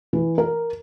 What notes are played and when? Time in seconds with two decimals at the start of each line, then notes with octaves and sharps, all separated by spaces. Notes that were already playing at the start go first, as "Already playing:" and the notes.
0.13 E3
0.38 A#4